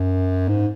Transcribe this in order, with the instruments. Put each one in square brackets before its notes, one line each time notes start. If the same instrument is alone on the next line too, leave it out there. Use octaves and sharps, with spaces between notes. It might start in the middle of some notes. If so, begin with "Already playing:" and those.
Already playing: [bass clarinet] F#2
G#2